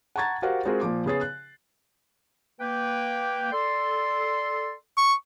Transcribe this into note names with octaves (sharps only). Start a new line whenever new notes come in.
F#5 A5 A#5 C#6 G#6 A6
F#4 G4 A#4 C5 F5 F#5
G#3 C4 F4 F#4 G#4 A#4
A#2 F3 D6
C#3 B3 G#4 C#5 A6 C7
F#6
A#3 B4 G5
A4 D5 C6
C#6